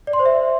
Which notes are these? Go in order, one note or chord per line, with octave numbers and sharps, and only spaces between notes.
D5
C6
C5
E5